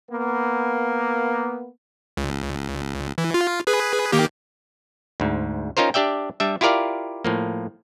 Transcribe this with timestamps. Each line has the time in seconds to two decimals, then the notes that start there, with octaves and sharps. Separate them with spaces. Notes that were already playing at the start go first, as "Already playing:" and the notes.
0.11 A#3 B3
2.17 C#2
3.18 E3
3.34 F4
3.67 G#4 B4
4.12 D#3 A#3 G4
5.20 D2 G#2
5.77 C#4 D#4 F4 A#4 C5
5.94 D4 G4 D5 E5 G5
6.40 G3 D4 E5
6.61 E4 F4 G4 A#4 D5 F5
7.25 A2 F3 A#3